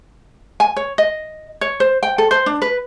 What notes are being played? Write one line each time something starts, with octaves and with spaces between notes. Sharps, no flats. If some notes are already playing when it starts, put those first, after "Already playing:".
G#5
C#5
D#5
C#5
C5
G5
A4
C5
D4
B4